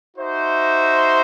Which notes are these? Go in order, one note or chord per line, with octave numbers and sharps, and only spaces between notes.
D#4 F#4 C5 E5